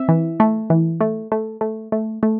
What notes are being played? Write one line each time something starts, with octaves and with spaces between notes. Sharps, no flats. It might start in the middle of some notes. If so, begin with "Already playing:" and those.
Already playing: C4 E5
E3
A3
E3
A3
A3
A3
A3
A3